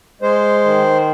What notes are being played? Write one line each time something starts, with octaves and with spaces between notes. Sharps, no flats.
G#3 C5
D#3